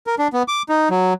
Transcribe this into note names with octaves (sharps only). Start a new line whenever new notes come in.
A#4
D4
B3
D6
D#4
F#3